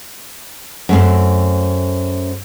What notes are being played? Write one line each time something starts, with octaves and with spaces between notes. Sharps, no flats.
F#2 A3 C4